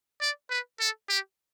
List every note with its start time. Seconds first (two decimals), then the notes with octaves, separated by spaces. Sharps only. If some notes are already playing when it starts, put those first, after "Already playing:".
0.21 D5
0.50 B4
0.80 A4
1.09 G4